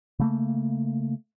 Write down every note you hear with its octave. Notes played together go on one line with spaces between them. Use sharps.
C#3 A3 A#3